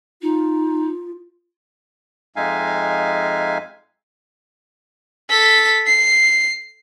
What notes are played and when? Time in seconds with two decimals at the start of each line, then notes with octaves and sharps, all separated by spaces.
0.22 D#4 F4
2.36 F2 G#3 D#4 E5 F5 G#5
5.30 A4 B6
5.87 C7